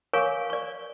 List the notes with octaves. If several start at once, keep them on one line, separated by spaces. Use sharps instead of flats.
A#4 C#5 F5 G#5 C#6 D6
D5 C#6